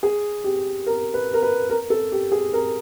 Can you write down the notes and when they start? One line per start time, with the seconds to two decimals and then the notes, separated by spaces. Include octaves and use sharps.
0.03 G#4
0.44 G4
0.87 A#4
1.14 B4
1.34 A#4
1.43 B4
1.70 A#4
1.90 A4
2.12 G4
2.32 G#4
2.53 A#4